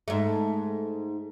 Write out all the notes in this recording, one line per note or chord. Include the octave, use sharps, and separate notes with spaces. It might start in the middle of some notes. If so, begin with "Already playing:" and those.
G#2 A3